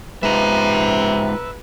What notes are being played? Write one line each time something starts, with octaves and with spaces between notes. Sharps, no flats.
C3 G#3 D#4 F4 B4 E5 A#5